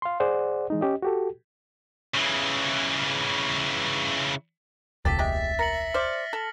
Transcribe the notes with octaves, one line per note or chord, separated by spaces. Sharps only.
F5 C6
G#4 C5 D5 F#5
E3 G#3 D#4
C#4 G4 D#5
F#4 G4 A4
C#3 E3
E1 C#2 F4 G4 A4 A6 B6
G#3 G4 E5
A#4 A#6 C#7 F#7
C5 D5 F6
A4